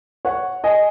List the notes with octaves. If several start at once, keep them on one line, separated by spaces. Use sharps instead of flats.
C#5 F#5
D#5 G#5